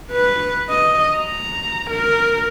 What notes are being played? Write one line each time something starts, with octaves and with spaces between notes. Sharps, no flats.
B4
D#5
A#5
A#4